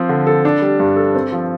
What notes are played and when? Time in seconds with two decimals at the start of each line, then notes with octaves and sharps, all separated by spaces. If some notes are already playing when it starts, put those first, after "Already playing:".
Already playing: F3 C4
0.09 D3
0.27 A4
0.45 D4
0.62 G3
0.80 G2
0.97 A4
1.15 C4
1.32 F3